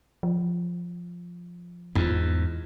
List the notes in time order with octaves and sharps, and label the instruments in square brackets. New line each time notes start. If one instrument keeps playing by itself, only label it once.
[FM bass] F3
[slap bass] E2 G#2 [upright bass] F4